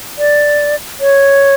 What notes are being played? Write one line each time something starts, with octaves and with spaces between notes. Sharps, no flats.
D5
C#5